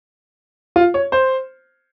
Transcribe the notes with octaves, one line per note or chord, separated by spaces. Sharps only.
F4
C#5
C5